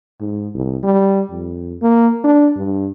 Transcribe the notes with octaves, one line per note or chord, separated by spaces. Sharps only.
G#2
C2
G3
F2
A#3
D4
G2